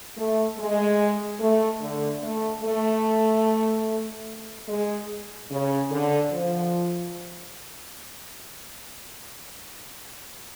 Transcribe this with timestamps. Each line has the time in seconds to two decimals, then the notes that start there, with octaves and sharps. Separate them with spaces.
0.17 A3
0.58 G#3
1.40 A3
1.81 D3
2.22 A3
2.63 A3
4.67 G#3
5.50 C#3
5.91 D3
6.32 F3